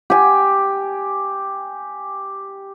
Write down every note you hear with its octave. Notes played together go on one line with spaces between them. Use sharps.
G4 G#5